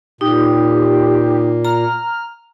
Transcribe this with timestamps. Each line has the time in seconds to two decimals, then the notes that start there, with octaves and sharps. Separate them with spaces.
0.21 A#2 D#4 G4
1.65 A#5 F6